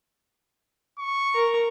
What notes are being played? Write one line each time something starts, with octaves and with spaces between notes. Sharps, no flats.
C#6
A#4